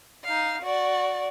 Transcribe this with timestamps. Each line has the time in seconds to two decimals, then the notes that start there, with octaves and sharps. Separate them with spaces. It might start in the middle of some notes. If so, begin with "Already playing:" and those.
0.24 D#4 F5
0.62 F#4 D5